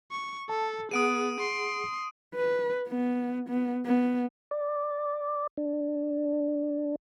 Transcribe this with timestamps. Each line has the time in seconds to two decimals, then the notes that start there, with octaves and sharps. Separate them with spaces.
0.11 C#6
0.49 A4 A5
0.91 B3 G#4 F#5 D#6 D7 D#7
1.40 C6
2.35 B4
2.88 B3
3.49 B3
3.86 B3
4.51 D5
5.57 D4